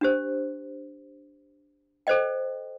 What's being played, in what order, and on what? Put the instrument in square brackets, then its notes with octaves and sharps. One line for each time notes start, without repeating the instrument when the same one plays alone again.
[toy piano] D4 G4 C5
A4 C5 D#5 G5